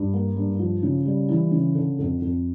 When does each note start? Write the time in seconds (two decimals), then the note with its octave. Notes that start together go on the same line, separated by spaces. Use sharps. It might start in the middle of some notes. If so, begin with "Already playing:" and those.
Already playing: G2
0.13 A#3
0.37 G2
0.59 F3
0.83 C#3
1.05 G3
1.29 E3
1.52 C#3
1.75 D3
1.99 F2
2.22 F2